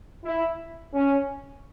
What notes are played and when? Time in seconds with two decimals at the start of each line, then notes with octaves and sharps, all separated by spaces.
0.24 E4
0.94 C#4